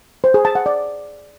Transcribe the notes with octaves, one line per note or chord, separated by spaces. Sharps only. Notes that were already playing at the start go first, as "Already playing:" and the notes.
C5
G#4
A5
F#5
D5